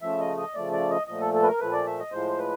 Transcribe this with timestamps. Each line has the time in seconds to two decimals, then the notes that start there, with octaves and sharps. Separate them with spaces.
0.02 C#3 F3 A3 E5
0.20 D#5
0.37 D#5
0.55 C#3 F3 A3 D5
0.72 D5
0.90 D#5
1.07 A#2 F3 A3 D#5
1.20 A4
1.34 A4
1.43 B4
1.46 A#4
1.60 A#2 F3 A3 B4
1.72 D5
1.86 E5
1.99 D#5
2.12 A2 F3 G#3 C5
2.38 B4